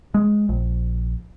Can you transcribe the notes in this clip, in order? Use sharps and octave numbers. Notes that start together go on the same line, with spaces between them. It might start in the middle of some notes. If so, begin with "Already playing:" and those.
G#3
A#1